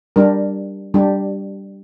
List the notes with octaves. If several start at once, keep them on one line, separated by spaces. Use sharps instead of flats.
G3 D4 G4 A#4
G3 D4 G4